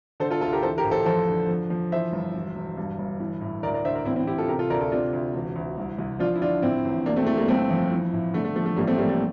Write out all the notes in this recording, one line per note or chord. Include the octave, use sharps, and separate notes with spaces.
D3 A4 C5
F4 A4
D2 F4 A4
G4 A#4
E3 A4 C5
G4 A#4
A1
A4 C5
F2 A4 C5
D3
F3
F3
E3 C5 E5
G1
E1
E1
G2
G1
E3
A2
D2 A#4 D5
A#4 D5
D3 C5 E5
A#4 D5
A1 C4 E4
C4 E4
A1 E4 G4
F4 A4
C3 G4 A#4
F4 A4
D2 A#4 D5
F4 A4
C3 D4 F4
D2
E1
D2
C2
C2
F3 D4 F4
E4
D3 D4 F4
A2 C4 E4
A1
E1 A#3 D4
A3 C4
E3 A3
G3 A#3
G1 A3 C4
F2
E3
A2
D3 A3
A3
F3 A3
A3
A1 G3 A#3
A3 C4
A1 G3 A#3
A3